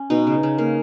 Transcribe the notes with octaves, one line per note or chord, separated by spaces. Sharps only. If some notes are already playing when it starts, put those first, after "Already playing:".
Already playing: C#4
B2 D#4
C#3
C#3
A#3